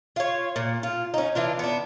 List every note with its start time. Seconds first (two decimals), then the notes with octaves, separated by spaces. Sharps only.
0.16 F4 C#5
0.56 A#2
0.83 F4
1.14 C#4 D#4
1.35 E3 D4 F4
1.59 B3 D4